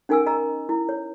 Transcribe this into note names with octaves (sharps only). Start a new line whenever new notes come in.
C#4 D#4 A#4 G#5 D#6 E6
D#5 A#5 E6
E4
C#5